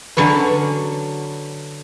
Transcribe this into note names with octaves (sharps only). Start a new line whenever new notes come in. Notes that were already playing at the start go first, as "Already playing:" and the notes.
D3 F#3 C#4 B4